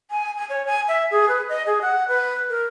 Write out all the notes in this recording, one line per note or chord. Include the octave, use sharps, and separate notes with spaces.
G#5
G#5
C#5
G#5
E5
G#4
B4
D#5
G#4
F#5
B4
A#4